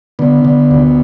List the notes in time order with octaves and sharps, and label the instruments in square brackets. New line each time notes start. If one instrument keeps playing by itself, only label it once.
[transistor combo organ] D3 B3
D3
D2